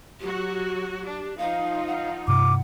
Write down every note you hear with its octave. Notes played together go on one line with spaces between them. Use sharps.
F#3 F#4 G4
D4
F3 D#4 F4 F5
F5 F#5
G2 C3 D6